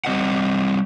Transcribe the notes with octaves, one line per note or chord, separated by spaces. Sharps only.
G3 C4 D#5 F#5